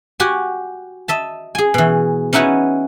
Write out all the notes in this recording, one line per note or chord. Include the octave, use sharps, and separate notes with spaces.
F#4 G4 G#5
D#5 E5 A5
G#4 G#5
B2 E3
C#4 D#4 E4 F#4 B4 C#5